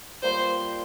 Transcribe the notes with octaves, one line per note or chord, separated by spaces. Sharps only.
G3 A#3 F4 C5